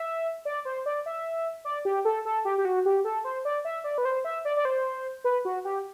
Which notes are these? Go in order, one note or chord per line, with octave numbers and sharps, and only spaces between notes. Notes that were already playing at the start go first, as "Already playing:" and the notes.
Already playing: E5
D5
C5
D5
E5
D5
G4
A4
A4
G4
G4
F#4
G4
A4
C5
D5
E5
D5
B4
C5
E5
D5
D5
C5
B4
F#4
G4